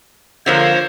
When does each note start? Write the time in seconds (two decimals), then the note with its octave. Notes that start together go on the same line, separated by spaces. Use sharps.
0.46 D3 F3 A#3 C5 C#5